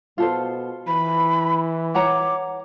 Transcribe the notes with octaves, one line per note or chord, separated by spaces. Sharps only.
B2 F4 A4 C5
E3 B5
C#5 F#5 A#5 D6